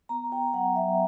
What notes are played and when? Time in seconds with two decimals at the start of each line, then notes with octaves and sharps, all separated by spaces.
0.09 B3 A#5
0.32 F#4 G5
0.54 F#3 F#5
0.75 F#3 E5